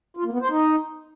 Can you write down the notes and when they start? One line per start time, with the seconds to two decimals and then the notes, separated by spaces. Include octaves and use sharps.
0.17 F4
0.25 A#3
0.33 B3
0.41 C5
0.50 D#4